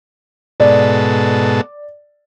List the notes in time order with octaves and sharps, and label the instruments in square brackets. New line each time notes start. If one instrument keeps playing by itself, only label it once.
[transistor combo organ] G#2 B2 A4 [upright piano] D5